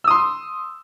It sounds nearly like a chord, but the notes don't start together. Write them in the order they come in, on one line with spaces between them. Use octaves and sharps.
E6 D#6 C6